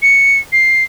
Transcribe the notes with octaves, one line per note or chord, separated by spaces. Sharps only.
C#7
C7